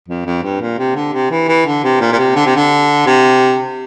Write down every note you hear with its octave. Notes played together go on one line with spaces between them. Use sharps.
F2
F2
G2
A#2
C3
D3
C3
E3
E3
D3
C3
A#2
A#2
C3
D3
C3
D3
C3